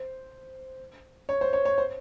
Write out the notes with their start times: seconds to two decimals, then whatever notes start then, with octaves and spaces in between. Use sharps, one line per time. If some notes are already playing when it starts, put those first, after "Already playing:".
Already playing: C5
1.29 C#5
1.41 C5
1.53 C#5
1.65 C#5
1.78 C5